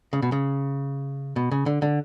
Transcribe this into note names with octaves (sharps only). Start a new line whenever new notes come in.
C#3
B2
C#3
B2
C#3
D3
D3